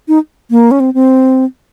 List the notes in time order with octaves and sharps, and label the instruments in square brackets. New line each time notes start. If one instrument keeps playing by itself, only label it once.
[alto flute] D#4
A#3
C#4
C4
C4